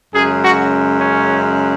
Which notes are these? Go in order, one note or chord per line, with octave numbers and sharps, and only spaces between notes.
F#2 C#3 G#3 G#4
F#4
C#4